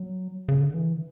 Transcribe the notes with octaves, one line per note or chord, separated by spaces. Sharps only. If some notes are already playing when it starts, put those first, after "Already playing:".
Already playing: F#3
C#3
D3
E3